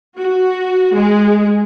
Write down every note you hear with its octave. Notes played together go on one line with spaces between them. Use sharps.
F#4
G#3